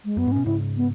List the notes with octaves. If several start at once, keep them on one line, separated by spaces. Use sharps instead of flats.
G#3
F#2 B3
G#2
B2 C#4
G#2 C#3 E4
B3